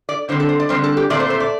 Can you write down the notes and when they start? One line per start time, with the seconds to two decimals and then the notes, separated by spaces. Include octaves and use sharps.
0.09 D5
0.29 D3 G3 C4 C5
0.40 A4
0.49 C5
0.60 D5
0.69 D3 G3 C4 C5
0.84 A4
0.97 G4
1.10 A#2 A3 C4 D5
1.20 C5
1.30 C5
1.40 D5